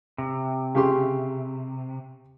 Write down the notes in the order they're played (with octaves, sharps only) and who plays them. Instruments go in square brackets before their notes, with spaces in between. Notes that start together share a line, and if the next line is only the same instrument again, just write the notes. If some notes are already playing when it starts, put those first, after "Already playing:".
[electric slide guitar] C3
[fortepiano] C#3 G4 C6